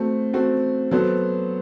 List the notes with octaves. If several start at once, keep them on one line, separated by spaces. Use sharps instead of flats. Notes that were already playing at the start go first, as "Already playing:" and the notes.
Already playing: A3 C4 F#4
A3 C4 F#4
F#3 B3 F#4 A4 C5